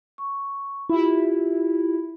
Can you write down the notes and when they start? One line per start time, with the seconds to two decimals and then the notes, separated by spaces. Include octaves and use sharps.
0.18 C#6
0.89 E4 F4 G4